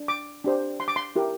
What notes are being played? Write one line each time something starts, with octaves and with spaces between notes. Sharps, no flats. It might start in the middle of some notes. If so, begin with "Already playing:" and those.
Already playing: D4
D6
D4 G4 C5
C6
D6
C6
E4 G4 A#4